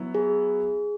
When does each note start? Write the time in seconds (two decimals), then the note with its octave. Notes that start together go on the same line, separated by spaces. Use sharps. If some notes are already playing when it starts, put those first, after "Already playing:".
Already playing: F#3 B3 E4
0.15 G#4